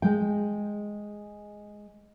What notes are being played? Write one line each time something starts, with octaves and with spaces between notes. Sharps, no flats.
G#3 G5